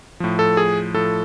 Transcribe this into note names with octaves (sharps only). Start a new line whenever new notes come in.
A2 F3
A4
G#4
A2 F3 A4